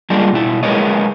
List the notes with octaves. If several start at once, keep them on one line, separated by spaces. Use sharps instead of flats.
G3 G#3 A#3 D4 F4
B2 E4
G#3 G#4 A#4 B4 C#5 D#5